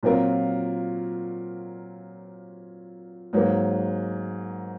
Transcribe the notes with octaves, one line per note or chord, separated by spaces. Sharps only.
A#2 F#3 C4 F4 A#4
G#2 F#3 A#3